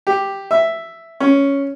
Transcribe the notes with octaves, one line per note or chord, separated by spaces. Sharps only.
G4
E5
C#4